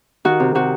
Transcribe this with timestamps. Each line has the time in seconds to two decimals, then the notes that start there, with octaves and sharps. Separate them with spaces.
0.25 D#3 F#4
0.40 C3
0.55 C3 F#4